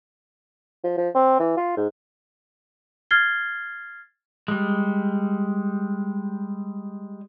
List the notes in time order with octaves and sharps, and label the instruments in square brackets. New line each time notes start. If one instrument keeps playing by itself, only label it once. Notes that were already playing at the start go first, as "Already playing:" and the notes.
[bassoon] F3
F3
C4
E3
F4
G#2
[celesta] F6 G#6 A6 C7 G7
[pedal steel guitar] G3 G#3